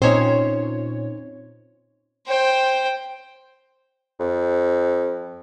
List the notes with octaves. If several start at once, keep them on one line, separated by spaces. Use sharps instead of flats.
A#2 C4 C#4 D#4 C5 C#5
C5 G5
F2